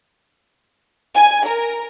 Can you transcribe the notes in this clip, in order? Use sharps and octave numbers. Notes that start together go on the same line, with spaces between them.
G#5
A#4